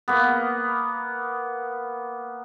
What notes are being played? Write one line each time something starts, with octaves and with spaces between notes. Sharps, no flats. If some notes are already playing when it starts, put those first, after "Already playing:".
A#3 B3